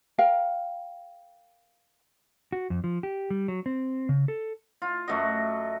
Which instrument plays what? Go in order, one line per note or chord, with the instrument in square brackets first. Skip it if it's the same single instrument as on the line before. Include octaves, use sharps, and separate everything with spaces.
[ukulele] A#4 F5 G5
[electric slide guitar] F#4
F2
F3
G4
G3
F#3
C4
C#3
A4
[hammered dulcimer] F4
F#2 A3 F#4 D#5